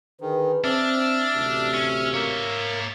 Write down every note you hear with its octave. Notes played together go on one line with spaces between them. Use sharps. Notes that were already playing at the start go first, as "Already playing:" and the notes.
D3 D#3 G#4 B4
C4 D4 D5 E5 F6
A1 D2 C3
C#4
A#3 C#5 E5